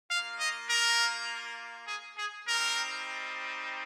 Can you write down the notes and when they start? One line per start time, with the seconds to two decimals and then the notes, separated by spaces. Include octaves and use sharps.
0.10 A#3 F4 F5
0.40 D#5
0.69 A#4
1.87 G#4
2.17 G#4
2.47 G3 C4 D#4 A#4